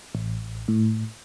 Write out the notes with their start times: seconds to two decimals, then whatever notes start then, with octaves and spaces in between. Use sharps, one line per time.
0.15 A1
0.68 A2